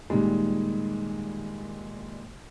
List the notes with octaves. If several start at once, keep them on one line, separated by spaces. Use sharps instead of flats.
A#2 D#3 G3 G#3